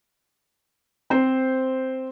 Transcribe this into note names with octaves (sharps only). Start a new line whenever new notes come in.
C4 C5